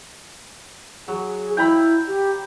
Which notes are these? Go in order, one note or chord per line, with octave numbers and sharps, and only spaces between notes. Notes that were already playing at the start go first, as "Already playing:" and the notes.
F#3 G#4
E4 G5 A#5 B5
G4